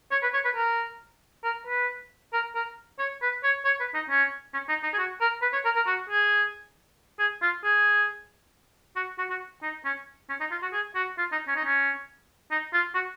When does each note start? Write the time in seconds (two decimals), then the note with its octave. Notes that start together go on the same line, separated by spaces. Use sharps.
0.12 C#5
0.23 B4
0.34 C#5
0.45 B4
0.56 A#4
1.44 A#4
1.67 B4
2.33 A#4
2.55 A#4
2.99 C#5
3.22 B4
3.44 C#5
3.65 C#5
3.80 B4
3.95 D#4
4.10 C#4
4.54 C#4
4.69 D#4
4.83 D#4
4.94 G#4
4.99 F#4
5.21 A#4
5.42 B4
5.53 C#5
5.65 A#4
5.76 A#4
5.87 F#4
6.10 G#4
7.20 G#4
7.42 F4
7.64 G#4
8.96 F#4
9.19 F#4
9.30 F#4
9.63 D#4
9.85 C#4
10.29 C#4
10.40 D#4
10.52 F4
10.62 F#4
10.73 G#4
10.95 F#4
11.18 F4
11.32 D#4
11.48 C#4
11.56 D#4
11.65 C#4
12.51 D#4
12.73 F4
12.95 F#4